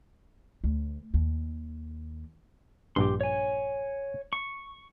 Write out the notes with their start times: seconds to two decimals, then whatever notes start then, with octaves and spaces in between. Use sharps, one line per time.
0.64 D2
1.14 D#2
2.96 A#1 G2 G4 C6
3.21 C#5 G#5
4.33 C#6